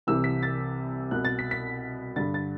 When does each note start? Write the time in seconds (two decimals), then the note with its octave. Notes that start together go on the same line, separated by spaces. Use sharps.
0.07 C2 C3 E3 E6
0.24 B6
0.43 A6
1.11 C2 B2 F#6
1.25 A6
1.39 B6
1.51 B6
2.16 G2 D3 A6
2.34 A6